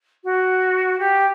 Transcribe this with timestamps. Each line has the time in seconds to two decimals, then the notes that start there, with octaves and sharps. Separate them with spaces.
0.24 F#4
0.99 G4